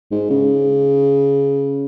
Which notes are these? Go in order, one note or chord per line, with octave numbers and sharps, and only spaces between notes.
G#2
C#3